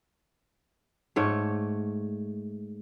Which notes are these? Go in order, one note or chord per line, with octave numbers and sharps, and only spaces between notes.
G#2 A3 C#5